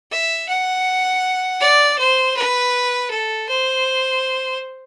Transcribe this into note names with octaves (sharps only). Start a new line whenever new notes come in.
E5
F#5
D5
C5
B4
A4
C5